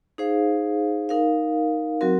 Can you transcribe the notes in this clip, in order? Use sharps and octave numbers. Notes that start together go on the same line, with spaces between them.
D#4 G#4 C5 F5
D#4 A#4 F5
F#3 C4 F#4 A#4